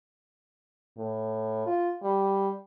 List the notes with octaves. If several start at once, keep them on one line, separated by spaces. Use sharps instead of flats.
A2
F4
G3